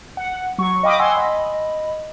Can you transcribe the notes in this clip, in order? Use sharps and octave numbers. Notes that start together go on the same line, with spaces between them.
F#5
F#3 C#6
D#5 F5 G5 B5 D6 D#6
F#5 G#5 C6 E6
D#5 B5